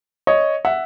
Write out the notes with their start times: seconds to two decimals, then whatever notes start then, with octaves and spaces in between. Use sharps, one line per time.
0.27 C#5 D#5
0.65 E5 F#5